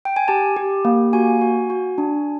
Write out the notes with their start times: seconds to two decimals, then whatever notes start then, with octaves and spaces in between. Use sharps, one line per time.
0.05 G5
0.16 G#5
0.28 G4 A5
0.57 G4
0.85 A#3
1.13 F#4 G#5
1.41 F#4
1.70 F#4
1.98 D4